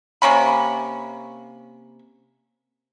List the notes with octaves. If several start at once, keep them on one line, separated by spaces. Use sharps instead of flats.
C3 A#3 C#4 B5